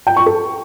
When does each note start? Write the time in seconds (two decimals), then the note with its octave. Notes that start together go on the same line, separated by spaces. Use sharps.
0.07 G5
0.16 C#6
0.26 A4